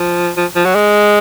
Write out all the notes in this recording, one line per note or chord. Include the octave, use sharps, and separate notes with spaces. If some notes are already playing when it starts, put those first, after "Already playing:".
Already playing: F3
F3
F3
F#3
G#3